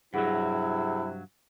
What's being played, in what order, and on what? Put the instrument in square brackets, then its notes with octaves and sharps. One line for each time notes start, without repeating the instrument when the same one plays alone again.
[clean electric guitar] G2 F#3 [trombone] C3 [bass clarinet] E4 [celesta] G#4 F#5